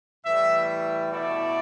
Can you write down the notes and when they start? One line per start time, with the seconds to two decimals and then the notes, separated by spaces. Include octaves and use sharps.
0.25 A2 E3 G3 E5
1.10 B2 A3 E4 D5